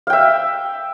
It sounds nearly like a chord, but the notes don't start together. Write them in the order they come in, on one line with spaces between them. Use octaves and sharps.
F5 G5 E5